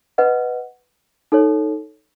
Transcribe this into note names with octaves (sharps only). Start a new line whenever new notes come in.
B4 D#5 F#5
D#4 A4 C#5